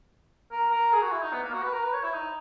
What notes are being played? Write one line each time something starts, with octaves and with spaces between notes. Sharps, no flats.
A#4
A#4
G#4
F#4
E4
D#4
B3
A#3
F#4
B4
A#4
B4
C#5
E4
D#4